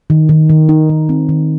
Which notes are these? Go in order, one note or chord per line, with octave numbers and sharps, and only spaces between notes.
D#3
D#3
D#3
D#4
D#3
C4
D#3